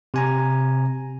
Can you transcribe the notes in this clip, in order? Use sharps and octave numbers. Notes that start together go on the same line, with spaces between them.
C3 G#5 A#5